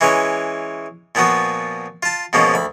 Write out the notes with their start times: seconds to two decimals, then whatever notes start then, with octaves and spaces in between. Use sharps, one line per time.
0.01 E3 G#3 C#4 B4 C#5
1.15 A#2 F3 B3 F#4
2.03 F4 A5
2.33 G#2 B2 F3 A#3 C#4
2.54 D2 B5